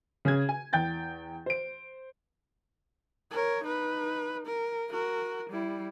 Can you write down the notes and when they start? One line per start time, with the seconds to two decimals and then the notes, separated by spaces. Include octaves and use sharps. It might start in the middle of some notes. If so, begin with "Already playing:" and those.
0.25 C#3 G#4 G#6
0.49 G#5
0.73 E2 G5 G6 A6
1.46 C5 D7
3.31 A#4 C#5
3.64 D#4 B4
4.46 A#4
4.90 F#4 A#4
5.49 G3 E4